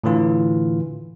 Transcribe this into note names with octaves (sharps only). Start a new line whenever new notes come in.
A2 D3 E3 F4